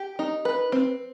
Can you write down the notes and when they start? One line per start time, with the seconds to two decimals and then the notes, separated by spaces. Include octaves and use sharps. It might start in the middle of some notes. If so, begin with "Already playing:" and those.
Already playing: G4
0.19 D#4
0.45 B4
0.72 C4